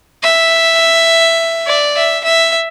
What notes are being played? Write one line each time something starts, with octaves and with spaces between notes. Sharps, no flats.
E5
D5
E5
E5